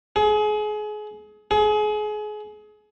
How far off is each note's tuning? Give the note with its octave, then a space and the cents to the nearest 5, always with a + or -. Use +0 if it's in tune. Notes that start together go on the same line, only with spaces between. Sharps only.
G#4 +30
G#4 +30